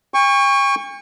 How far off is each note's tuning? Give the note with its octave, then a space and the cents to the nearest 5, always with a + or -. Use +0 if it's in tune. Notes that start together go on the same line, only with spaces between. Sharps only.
G5 +45 C#6 +0